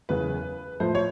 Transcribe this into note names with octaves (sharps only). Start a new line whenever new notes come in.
F#1 E2 C#3 B4
A2 F3 A3 C5
C#5